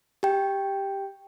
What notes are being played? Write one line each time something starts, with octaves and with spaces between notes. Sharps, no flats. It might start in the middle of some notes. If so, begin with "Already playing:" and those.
G4 G5